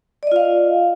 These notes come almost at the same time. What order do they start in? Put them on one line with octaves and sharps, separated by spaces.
D5 D#5 F4 F5